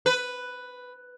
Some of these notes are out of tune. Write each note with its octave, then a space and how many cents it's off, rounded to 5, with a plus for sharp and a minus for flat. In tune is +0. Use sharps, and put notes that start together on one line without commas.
B4 +5